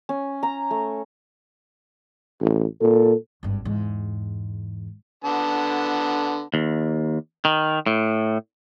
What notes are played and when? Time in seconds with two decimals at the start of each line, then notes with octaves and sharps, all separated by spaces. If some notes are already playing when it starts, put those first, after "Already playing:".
0.09 C#4
0.43 A#5
0.71 A3
2.40 A1
2.81 A#2 A4
3.43 G#1 G2
3.65 E2 G#2
5.24 D3 B3 A5
6.54 D#2
7.45 D#3
7.86 A2